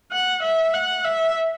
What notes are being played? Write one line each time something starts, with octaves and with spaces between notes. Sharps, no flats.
F#5
E5
F#5
E5